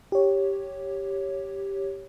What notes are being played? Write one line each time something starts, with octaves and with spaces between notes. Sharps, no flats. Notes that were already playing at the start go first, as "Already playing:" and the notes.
G4 C#5